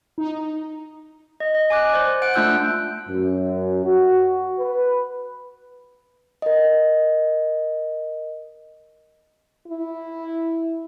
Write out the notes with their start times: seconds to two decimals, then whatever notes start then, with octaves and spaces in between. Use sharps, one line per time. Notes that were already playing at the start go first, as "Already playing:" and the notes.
0.18 D#4
1.40 D#5
1.55 D#5
1.70 G#5 D6 F#6
1.93 C5 D5
2.22 F#5 F#6 D7
2.34 A3 D4 F4 E6 F#6 G6
3.09 F#2
3.84 F#4
4.59 B4
6.42 A#4 D#5
9.67 E4